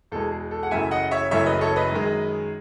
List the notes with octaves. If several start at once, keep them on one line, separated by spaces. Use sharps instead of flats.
E2 B2 G#3 A4
G#4
A4
F#5
F#1 F#2 E3 A3 E5 G#5
D#5 F#5
C#5 E5
F#1 F#2 E3 A3 C#5 E5
B4 D#5
A4 C#5
B4 D#5
F#2 D#3 G#3